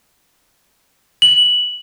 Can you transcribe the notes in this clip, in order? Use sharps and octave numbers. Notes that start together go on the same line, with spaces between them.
F#7